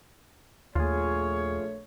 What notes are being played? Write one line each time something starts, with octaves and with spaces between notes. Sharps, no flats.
A#1 D#2 A3 F4 G#4 C#5